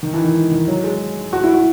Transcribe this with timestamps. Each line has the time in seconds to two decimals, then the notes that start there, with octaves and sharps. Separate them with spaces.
0.03 D#3
0.14 E3
0.24 D#3
0.51 D#3
0.68 F#3
0.84 G#3
1.33 F#4
1.43 E4
1.54 F#4